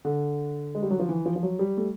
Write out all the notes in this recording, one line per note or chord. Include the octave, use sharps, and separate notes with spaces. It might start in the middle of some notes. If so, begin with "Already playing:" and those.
D3
G#3
G3
F#3
F3
E3
F3
F3
F#3
G3
A3